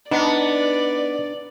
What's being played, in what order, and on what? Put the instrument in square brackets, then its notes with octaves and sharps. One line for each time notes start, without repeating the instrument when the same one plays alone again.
[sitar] B3 [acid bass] D4 [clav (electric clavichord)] D#4 [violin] D5